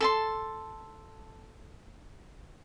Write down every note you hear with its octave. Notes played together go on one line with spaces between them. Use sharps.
A4 A5 C6